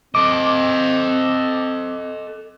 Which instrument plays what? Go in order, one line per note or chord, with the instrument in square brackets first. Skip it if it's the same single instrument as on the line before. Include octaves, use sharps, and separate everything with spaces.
[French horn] C4 [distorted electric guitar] A4 D#5 [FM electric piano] D6